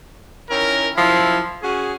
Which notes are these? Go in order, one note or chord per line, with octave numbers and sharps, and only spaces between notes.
D#3 C#4 E4 A#4
F#2 F3 E4
C#4 F#4 G#4